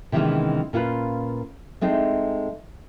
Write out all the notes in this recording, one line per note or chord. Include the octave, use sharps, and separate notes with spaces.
C3 D#3 E3 G#3 B3 C#4
A#2 C#4 F4 A4 B4
G#3 A3 C4 D#4